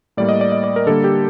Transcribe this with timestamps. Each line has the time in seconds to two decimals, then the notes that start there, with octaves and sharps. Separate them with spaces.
0.17 A2 G3 A#3 D5
0.29 D#5
0.41 D5
0.52 D#5
0.64 D5
0.76 A#4
0.87 D3 G3 A#3 A4
1.04 G4